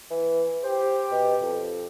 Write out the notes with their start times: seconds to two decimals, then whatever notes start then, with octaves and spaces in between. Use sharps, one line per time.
0.10 E3
0.63 G4 C5
1.11 B2
1.41 F2